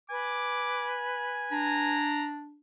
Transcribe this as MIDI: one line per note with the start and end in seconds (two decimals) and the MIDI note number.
0.10 1.96 71
0.10 2.12 80
0.10 0.97 86
1.52 2.61 62
1.52 2.28 82